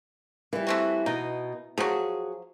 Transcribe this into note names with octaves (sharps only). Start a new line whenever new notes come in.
E3 G3
A3 C4 F#4
B2 D#4
F3 F#3 F#4 G#4